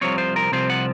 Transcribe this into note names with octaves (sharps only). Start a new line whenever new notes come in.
C2 C3 F3 C4 C#5
C5
A#4
C2 C3 F3 C4 C5
F#5